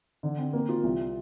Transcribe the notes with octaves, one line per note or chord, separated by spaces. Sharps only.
D3
C4
A#3
F4
C2